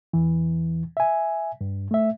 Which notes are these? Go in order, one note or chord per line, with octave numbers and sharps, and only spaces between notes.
E2 E3
E5 G#5
G2
A3 E5